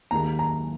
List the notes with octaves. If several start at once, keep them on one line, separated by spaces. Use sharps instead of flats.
D#2 D#3 A#3 G#4 A#5
A#5